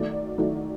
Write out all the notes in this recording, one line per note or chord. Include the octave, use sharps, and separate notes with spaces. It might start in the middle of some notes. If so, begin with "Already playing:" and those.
Already playing: D#3 F#3 A3 D5
D#3 F#3 A3